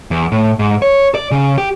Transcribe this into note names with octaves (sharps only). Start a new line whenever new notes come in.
E2
A2
G#2
C#5
D5
C#3
G4